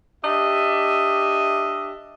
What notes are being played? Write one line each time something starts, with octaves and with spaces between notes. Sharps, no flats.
D4 G4 D#5 E5